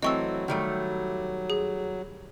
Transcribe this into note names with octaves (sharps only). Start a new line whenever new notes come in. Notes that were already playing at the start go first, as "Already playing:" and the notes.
E3 F#3 A3 C4 D#5 C#6 E6
D#3 G3 A3
G#4